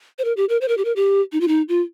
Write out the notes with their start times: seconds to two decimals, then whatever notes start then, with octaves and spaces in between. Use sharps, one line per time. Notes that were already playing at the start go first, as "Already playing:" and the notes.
0.18 C5
0.25 A#4
0.37 G4
0.49 A#4
0.61 C5
0.68 A#4
0.77 G4
0.85 A#4
0.96 G4
1.32 D#4
1.41 F4
1.48 D#4
1.69 F4